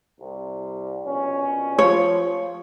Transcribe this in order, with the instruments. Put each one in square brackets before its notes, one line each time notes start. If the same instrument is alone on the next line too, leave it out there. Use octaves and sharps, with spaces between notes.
[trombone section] C2
A#1 B2 C#4
[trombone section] F3 [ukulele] C#5